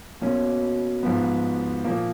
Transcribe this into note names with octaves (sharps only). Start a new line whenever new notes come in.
B2 A#3 C#4
G#2 F3 B3
A#2 F3 A#3